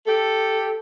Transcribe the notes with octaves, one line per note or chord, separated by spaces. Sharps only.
G4 A4